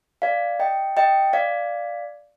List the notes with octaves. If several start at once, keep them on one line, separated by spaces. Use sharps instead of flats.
D5 F5
D#5 G5
D#5 G5
D5 F5